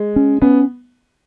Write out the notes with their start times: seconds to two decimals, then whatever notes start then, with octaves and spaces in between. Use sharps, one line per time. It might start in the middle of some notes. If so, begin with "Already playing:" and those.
Already playing: G#3
0.16 C#4
0.42 B3 C#4